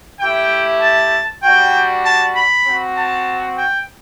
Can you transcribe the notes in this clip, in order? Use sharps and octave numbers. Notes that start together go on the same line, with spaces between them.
A3 E4 G4 G5
A5
G3 D4 F#4 G5
A5
B5
C4 F#4
A5
G5